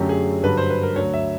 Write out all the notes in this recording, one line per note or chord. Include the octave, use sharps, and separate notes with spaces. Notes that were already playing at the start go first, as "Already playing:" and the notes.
Already playing: F#2 D3 F#3 A3 C#4 G4
G#4
G2 D3 F#3 B4
C5
B4
A#4
D2 D3 F#3 C#5
E5